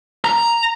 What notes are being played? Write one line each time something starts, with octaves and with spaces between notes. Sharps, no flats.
A#5